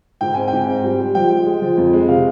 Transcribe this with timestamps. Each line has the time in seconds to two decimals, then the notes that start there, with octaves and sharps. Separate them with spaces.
0.21 G#2 G5
0.34 C4 G#5
0.48 G#2 G5
0.67 C4
0.84 G3
1.00 G3
1.15 F3 G5
1.30 G#3
1.46 G#3
1.62 F3
1.78 F2
1.93 G#3
2.09 C3 F5